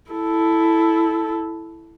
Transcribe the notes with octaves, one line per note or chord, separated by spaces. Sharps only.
E4 A4